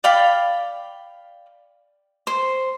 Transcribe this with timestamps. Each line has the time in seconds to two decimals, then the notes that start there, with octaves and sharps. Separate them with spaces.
0.04 D5 F5 G5 B5
2.27 C5